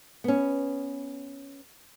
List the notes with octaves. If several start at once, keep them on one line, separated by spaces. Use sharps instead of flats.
B3 C#4